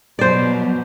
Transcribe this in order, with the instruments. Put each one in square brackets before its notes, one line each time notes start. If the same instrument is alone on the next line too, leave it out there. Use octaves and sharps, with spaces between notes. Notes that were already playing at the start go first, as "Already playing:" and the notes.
[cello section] B2 F#3 [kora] C5 D5